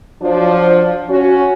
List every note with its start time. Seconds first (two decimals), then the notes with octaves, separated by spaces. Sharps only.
0.22 F3 F#3 D4
1.09 C#4 F#4